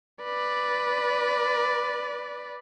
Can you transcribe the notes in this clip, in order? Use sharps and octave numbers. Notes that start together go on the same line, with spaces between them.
B4 D5